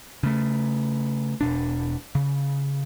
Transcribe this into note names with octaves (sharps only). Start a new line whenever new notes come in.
C#3 A3
E1 B2 D4
C#3